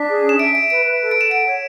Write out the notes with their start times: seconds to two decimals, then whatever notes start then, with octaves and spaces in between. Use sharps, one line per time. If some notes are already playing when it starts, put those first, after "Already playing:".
Already playing: D4 B6
0.09 G#4
0.24 C#4
0.29 E7
0.39 E5 D7
0.55 E5 D7
0.70 B4 D7
0.85 B4
1.01 A4
1.11 A4 D7
1.21 E7
1.31 F#5 D7
1.47 C#5